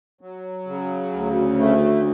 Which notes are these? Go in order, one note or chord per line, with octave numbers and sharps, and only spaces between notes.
F#3
C#3
D2
A3